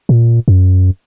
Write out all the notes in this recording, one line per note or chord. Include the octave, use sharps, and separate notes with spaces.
A#2
F#2